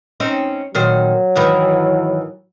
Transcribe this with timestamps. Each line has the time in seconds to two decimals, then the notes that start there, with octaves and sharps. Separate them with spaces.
0.20 C4 C#4 D#4
0.75 A#2 D#3 F#3 C5
1.35 G#2 D#3 E3